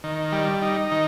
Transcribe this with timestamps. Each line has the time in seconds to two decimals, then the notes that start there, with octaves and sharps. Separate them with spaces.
0.04 D#3
0.32 G3
0.62 D#4
0.92 D#3